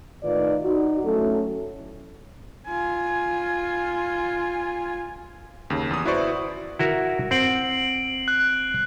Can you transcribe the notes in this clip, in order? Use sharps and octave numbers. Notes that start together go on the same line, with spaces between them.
A2 D#3 D#4 F4 B4 D5
D#4 F#4
F#3 A3 C#4 E4 A4
F4 G#5
D#2 C#3
E2 D#6
E4 F#4 B4 C5 D5 C#6
E4 F#4 A#4
C4 F#5 C7 D7 F#7
F#6